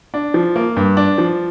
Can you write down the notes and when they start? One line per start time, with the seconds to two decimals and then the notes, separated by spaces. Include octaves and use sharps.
0.14 D4
0.34 F3
0.56 A#3
0.77 G2
0.97 D4
1.18 F3